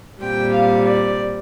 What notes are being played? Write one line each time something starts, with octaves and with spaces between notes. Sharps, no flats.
A#2 G3 C4 G5
F5
D5